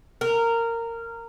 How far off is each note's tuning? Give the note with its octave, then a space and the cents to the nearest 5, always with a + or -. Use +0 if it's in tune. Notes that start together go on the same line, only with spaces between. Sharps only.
A#4 -15